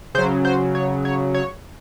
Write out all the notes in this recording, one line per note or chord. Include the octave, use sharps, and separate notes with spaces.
C#3 F#3 C5
C5
C#5
C#5
C#5